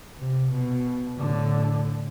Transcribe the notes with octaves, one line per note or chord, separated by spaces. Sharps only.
C3
B2
A2 D3